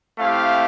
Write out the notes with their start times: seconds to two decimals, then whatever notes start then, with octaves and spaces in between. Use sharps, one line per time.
0.18 A3 C4 E4 G4 F5